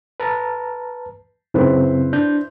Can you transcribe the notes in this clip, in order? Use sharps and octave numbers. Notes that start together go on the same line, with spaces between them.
B4 A5 A#5
F#2 C#3 C4 E4 B4 C5
D4 G6